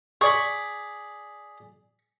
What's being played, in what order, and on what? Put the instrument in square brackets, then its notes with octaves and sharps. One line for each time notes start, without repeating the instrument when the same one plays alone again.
[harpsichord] G#4 D5 B5 [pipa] C#6